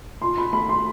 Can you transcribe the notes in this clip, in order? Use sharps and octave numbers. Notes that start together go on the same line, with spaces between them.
A#2 C6
B5
A3 B5
C6